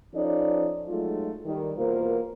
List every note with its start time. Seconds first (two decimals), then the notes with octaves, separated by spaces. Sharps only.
0.14 F3 C#4 D#4 A4 D5
0.87 F#3 G#3 A3 D#4 F4
1.44 D#3 G3
1.76 E2 B2 A#3 F4 A#4 C5